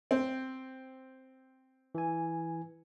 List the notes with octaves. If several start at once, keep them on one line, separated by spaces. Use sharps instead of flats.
C4
E3 G#5